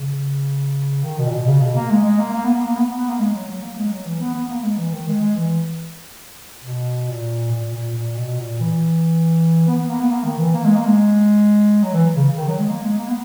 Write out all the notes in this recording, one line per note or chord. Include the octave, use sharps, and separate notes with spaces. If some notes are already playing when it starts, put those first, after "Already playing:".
Already playing: C#3
D#3
B2
A#2
B2
C#3
B2
A#3
G#3
G#3
A#3
A#3
B3
A#3
A#3
B3
B3
A#3
G#3
F#3
F#3
A#3
G#3
F#3
E3
B3
B3
A#3
G#3
E3
D#3
G#3
G#3
E3
B2
A#2
A#2
A#2
A#2
B2
A#2
E3
B3
B3
A#3
B3
A#3
D#3
E3
A#3
G#3
A#3
G#3
F#3
E3
C#3
D#3
F#3
G#3
A#3
G#3
A#3
B3